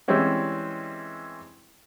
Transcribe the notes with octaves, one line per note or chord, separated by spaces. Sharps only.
E3 G3 G#3 C4 C#4 E4